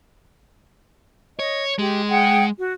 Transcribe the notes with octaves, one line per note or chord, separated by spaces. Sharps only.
C#5 D#5
G#3 G4
G#4 F#5 G5
F#4